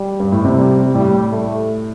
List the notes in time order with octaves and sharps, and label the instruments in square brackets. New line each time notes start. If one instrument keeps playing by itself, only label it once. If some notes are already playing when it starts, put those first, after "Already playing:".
Already playing: [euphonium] G3
[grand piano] G2
A2
C3
[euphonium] G3
[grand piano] A2 [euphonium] G3
[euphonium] A3